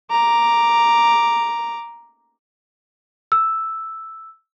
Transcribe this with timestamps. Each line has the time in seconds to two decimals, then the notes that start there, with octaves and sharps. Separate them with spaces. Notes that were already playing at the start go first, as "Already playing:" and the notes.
0.11 A#5 D6
3.32 E6